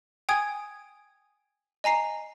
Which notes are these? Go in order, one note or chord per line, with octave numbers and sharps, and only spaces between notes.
G5 G#5 D#6 G#6
D#5 G#5 A#5 C7